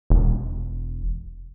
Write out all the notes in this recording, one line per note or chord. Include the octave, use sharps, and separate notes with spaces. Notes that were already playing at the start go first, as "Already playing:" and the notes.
E1